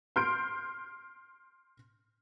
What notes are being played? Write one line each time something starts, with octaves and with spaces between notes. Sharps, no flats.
C6 F6 G6 D7